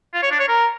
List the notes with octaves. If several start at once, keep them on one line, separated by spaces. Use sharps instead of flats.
F4
C#5
D4
C#5
A#4